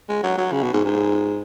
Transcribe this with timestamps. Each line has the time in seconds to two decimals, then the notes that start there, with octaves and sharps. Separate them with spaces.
0.09 G#3
0.23 F#3
0.38 F#3
0.52 C#3
0.63 B2
0.73 G#2
0.85 G#2